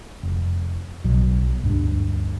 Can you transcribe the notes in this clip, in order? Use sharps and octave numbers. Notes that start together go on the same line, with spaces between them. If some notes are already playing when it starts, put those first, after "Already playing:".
F1
B1 B2 F#3
D2 G2